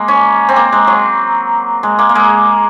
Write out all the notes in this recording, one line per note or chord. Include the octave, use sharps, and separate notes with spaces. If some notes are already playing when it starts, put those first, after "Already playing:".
Already playing: G#3 A#3
C#4
C4
A#3
G#3
F#3
G#3
A#3
A#3
G#3